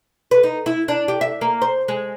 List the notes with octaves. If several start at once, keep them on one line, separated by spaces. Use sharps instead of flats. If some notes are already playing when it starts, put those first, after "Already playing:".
B4
D#4
E4
D4
G4
E5
A#3
C5
G#3